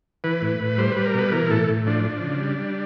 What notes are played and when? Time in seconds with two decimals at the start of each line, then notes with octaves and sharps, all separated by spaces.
0.24 E3 B4
0.42 A2
0.60 A2
0.78 G3 C5
0.92 G3 B4
1.05 A#4
1.14 B2 B4
1.32 E3 A#4
1.50 A2 A4
1.69 A2
1.87 F3 D4
2.05 F3
2.22 C#3
2.41 G3
2.59 G3